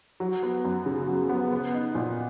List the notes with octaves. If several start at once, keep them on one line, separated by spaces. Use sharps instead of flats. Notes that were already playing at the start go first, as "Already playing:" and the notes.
F#3
B3
F#2
C#3
F#3
B3
B3
D#4
A#2